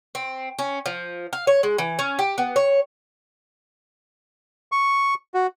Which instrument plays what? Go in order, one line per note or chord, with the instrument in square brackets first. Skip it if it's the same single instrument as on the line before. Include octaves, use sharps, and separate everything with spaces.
[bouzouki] C4
C#4
F3
F5
C#5
G#3
E3
C#4
G4
B3
C#5
[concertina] C#6
F#4